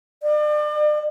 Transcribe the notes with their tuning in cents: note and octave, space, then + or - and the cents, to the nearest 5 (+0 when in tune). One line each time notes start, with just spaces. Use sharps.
D5 +40